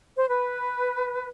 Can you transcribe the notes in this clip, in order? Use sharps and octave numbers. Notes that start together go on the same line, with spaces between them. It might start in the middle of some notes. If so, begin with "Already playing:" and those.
C5
B4